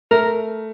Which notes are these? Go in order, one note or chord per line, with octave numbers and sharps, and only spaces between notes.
A3 A#4